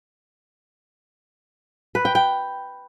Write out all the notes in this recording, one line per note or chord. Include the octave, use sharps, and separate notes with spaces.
B4
G5
G5